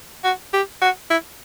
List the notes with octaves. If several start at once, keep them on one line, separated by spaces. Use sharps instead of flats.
F#4
G4
F#4
E4